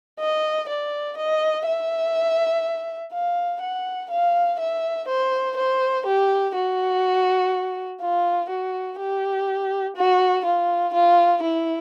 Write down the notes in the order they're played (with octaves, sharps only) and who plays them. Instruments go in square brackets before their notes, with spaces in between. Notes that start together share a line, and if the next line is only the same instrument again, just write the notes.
[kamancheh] D#5
D5
D#5
E5
F5
F#5
F5
E5
C5
C5
G4
F#4
F4
F#4
G4
F#4
F4
F4
E4